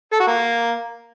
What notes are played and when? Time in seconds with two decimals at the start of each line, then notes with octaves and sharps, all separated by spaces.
0.12 A4
0.20 F#4
0.27 A#3